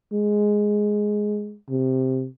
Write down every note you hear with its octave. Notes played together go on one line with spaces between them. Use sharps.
G#3
C3